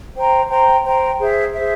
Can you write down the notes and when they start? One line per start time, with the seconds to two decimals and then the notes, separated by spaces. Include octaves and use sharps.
0.16 C5 G5 A#5
0.49 C5 G5 A#5
0.84 C5 G5 A#5
1.19 G#4 C5 E5
1.54 G#4 C5 E5